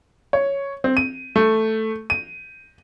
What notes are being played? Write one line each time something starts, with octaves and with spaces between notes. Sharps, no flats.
C#5
C4
D#7
A3
D#7